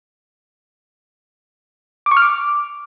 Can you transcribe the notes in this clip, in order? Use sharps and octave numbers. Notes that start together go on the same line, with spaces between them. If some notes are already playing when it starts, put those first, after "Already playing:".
D6
C#6
F6
D6